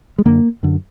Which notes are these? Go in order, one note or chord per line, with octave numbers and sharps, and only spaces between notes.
G#3
F#2 D3 A#3
F#2 D3